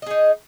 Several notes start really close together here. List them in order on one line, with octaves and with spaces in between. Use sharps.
D#5 G#4 D#4